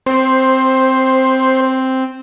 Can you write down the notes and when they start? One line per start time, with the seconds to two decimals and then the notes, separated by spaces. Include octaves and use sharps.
0.06 C4 C5